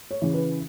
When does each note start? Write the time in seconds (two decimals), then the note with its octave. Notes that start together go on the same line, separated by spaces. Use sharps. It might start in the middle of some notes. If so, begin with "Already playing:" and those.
0.11 C#5
0.22 C#3 E3
0.34 B4